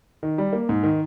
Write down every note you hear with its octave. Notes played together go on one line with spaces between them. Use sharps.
D#3
G3
A#3
G#2
D#3